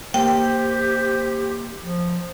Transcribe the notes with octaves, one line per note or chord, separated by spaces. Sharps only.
A#3 G4 C5 G5
F3